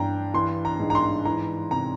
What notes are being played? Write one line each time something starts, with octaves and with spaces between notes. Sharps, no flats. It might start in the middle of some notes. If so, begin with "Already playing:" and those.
Already playing: G2 E3 G5 A#5
E3 C6
A#5
G#2
A#5
C6
E3 A#5
C3 A#5